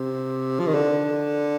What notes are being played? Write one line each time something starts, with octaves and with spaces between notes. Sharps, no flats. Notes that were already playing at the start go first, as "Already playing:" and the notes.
Already playing: C3
F3
D#3
D3